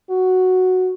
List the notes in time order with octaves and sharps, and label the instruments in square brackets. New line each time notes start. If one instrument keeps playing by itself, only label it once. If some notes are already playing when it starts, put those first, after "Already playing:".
[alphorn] F#4